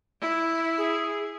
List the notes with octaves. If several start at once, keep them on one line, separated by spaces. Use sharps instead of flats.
E4
G#4